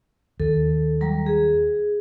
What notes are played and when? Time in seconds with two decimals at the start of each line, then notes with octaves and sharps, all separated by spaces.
0.40 D#2 A4
1.01 F#3 G3 A#5
1.26 G#4